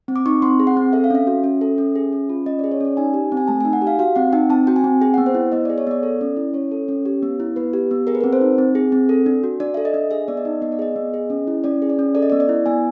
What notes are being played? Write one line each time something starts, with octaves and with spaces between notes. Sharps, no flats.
C4
D6
D#4 C#6
C4 C6
G#4
F#5
C4
A4 E5
F5
C#4 E5
F#4
C#4
A4
C#4
G#4
C#4
F4
C#4 D#5
G#4 D5
C#5
C#4 D5
D#4 G#5
G4
C4
G#5
A3 A5
D#4 G#5
F#5
G4
F5
F#4 F5
C4 F#5
D#4 G5
C4 A5
F#4 G5
G#5
C4
G#4 G5
B3 F#5
C5
E4
B3 D#5
G#4 D5
C#5
B3 D5
A4
C#4
E4
C#4 C#5
A4
C#4
G4
B3
E4
B3 B4
G4
B3
G#4 A#4
B4
C4 A#4
C5
D#4
C4
G#4
C4
A4
D4
F#4
D4 D5
A4 E5
D#5
D4
G#4 E5
B3 D5
D#5
D#4
B3 D#5
D5
G#4 D#5
B3
G#4
C#4
E4
C#4 D5
G#4
D5
C#4
A4 D5
D#5
B3 D5
D5
E4
B3 G#5